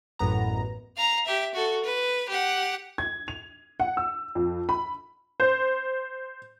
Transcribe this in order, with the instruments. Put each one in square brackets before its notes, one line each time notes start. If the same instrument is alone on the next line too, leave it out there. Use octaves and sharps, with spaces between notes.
[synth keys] A1 F#2 B3 A#5
[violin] F5 A#5
G4 E5
F#4 A4
B4
G4 F#5
[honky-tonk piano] G#6
F7
F#5
E6
F2
B5
C5